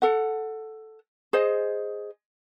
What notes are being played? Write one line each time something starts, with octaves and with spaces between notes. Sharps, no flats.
A4 F#5
G#4 C5 D#5